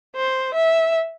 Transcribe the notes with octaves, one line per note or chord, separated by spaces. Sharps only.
C5
E5